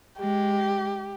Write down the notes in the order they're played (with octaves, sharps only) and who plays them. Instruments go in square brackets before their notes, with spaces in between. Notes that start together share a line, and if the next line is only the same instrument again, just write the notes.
[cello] G#3 [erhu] G4